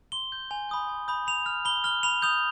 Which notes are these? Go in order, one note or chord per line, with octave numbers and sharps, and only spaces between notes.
C6 G7
G6
G#5
B5 D#6 G6
G#5
B5 D#6 G6
B5 F7
F6
B5 G7
F6 G7
B5 F7
D#6 G6 F7